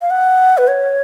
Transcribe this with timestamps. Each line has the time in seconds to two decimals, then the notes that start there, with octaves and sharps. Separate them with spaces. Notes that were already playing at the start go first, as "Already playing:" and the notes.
0.02 F5
0.10 F#5
0.58 B4
0.68 C#5